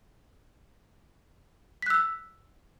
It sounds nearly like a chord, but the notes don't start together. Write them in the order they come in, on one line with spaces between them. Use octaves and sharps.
B6 F#6 E6